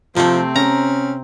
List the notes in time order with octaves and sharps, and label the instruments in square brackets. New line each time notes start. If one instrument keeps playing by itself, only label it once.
[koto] C3 A3 [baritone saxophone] F3 [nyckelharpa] C4
[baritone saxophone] C#4 [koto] A#5